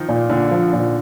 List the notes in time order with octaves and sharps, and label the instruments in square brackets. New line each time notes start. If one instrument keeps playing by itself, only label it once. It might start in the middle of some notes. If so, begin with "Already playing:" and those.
Already playing: [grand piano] D#3 F3
[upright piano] A#2
[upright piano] A#2 [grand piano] D3
[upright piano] F3
A#2